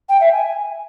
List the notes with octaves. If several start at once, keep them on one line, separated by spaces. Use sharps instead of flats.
G5
E5
G#5